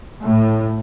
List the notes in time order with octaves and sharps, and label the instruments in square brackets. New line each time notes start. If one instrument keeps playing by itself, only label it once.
[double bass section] A2